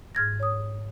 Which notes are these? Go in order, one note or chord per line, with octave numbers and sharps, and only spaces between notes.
G#2 F6 G#6 A#6
C#5 D#6